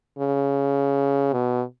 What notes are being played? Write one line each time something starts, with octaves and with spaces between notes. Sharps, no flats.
C#3
B2